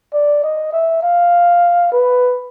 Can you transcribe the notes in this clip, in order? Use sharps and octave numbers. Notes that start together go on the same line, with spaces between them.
D5
D#5
E5
F5
B4